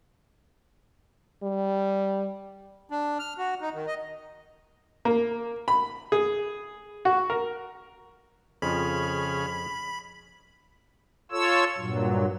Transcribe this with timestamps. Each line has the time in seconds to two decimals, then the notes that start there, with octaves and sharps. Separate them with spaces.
1.43 G3
2.90 D4
3.19 F6
3.38 F#4
3.61 D#4
3.74 D#3
3.87 D#5
5.05 A#3
5.68 B5
6.12 G#4
7.05 F#4
7.30 A#4
8.62 F2 C#3 F3 G#4 B5 F6
11.32 F4 A4 C#5 E6
11.78 G2 A#2 F#3